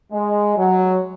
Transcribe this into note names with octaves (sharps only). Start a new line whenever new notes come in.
G#3
F#3